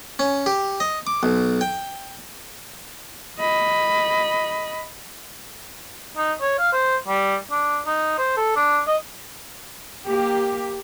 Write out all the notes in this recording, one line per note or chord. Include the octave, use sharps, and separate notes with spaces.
C#4
G4
D#5
D6
B1
G5
D#5 B5
D#4
C#5
F5
C5
G3
D4
D#4
C5
A4
D4
D#5
A#3 G4